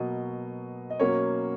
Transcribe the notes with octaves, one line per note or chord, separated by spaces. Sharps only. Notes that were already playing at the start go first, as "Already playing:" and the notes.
Already playing: B2 F#3 A#3 D#5
D#5
B2 F#3 A#3 C#4 C#5